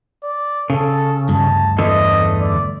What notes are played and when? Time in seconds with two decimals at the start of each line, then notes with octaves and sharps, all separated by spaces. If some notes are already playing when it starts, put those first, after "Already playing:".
0.23 D5
0.70 C#3 A4
1.29 D2 G2 A5
1.78 E2 D3 A3 D#5
2.40 D5